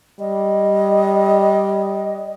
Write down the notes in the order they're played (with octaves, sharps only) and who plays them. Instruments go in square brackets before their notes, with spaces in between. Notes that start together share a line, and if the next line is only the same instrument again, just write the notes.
[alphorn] G3 [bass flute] D#5